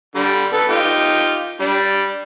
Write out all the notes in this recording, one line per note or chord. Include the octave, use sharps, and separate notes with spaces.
D3 G3
B3 A4 B4
D#4 F4 G4
G3 D4